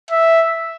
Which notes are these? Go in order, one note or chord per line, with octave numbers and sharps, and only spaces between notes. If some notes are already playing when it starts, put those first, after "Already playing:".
E5